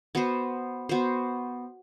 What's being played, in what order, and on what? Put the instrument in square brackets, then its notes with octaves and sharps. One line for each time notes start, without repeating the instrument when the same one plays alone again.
[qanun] B3 F#4 C5
B3 F#4 C5